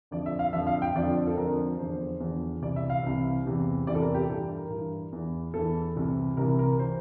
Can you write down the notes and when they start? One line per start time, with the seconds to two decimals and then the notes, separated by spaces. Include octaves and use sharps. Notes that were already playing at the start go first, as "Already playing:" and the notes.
0.11 F2 D3 F3 D5
0.26 E5
0.39 F5
0.53 F2 D3 F3 E5
0.67 F5
0.82 G5
0.95 F2 D3 F3 D5
1.27 A4
1.37 F2 D3 F3 A#4
1.78 E2 D3 F3 C5
2.20 E2 D3 F3
2.62 C2 C3 E3 D5
2.76 E5
2.90 F5
3.03 C2 C3 E3
3.45 E2 C3 E3
3.87 E2 C3 E3 D5
3.95 A4
4.02 A#4
4.14 G4
4.29 G2 E3 A4
4.57 A#4
4.70 G2 E3
5.12 E2 E3
5.54 E2 E3 A4
5.95 C2 C3 E3
6.37 C2 C3 E3 A#4
6.59 A#4
6.79 E3 C5